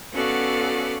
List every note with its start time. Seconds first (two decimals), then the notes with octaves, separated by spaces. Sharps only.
0.12 B3 C#4 F#4 A4 D5 F5